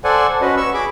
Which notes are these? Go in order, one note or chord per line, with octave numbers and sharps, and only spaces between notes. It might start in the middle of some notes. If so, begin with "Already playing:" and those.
A4 C5 D5 F#5 G#5
C#4 F#4 B4 D#5
C#6 E6
G#4 B5 D6